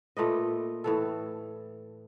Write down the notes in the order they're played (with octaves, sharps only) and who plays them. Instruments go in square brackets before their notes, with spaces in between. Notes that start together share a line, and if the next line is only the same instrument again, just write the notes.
[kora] A#2 A3 B4 D#5
A2 E3 A4